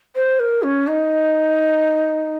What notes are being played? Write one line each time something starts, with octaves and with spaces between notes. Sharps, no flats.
C5
A#4
C#4
D#4